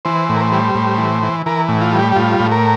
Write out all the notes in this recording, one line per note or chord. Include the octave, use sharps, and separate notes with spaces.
E3 C5
A2
A#4
C5
G3
A2
E3
E3
E3 A#4
A2
F4
G3
G4
G4
A2 F4
A2
A#4